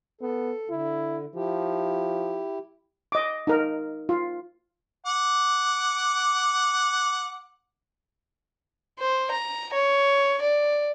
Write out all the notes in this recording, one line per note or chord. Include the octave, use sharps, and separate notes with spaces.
B3 A4
D3 E4
F3 E4 G4
D#5 D6
D#4 A#4
F4
F#5 D6
C5
A#5
C#5
D5